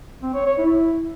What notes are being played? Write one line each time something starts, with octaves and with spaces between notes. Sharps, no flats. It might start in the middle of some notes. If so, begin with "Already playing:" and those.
C4
C#5
C#5
E4